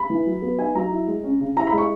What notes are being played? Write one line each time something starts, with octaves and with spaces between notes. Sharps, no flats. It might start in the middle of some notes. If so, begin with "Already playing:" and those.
Already playing: B5
E3
F#3
B3
D#4 G#5
F#3 A#5
E4
G#3
C#4
C#3
E4 A#5
B5
G#3
C#6